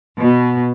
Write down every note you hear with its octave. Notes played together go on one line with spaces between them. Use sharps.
B2